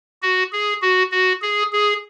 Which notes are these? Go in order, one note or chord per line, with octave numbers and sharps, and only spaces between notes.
F#4
G#4
F#4
F#4
G#4
G#4